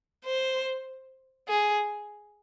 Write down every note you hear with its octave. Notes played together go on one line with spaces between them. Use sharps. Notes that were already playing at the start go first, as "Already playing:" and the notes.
C5
G#4